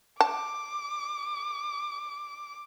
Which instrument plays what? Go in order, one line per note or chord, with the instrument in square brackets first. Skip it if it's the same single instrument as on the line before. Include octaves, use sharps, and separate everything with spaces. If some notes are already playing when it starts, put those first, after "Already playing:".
[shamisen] A5 [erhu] D6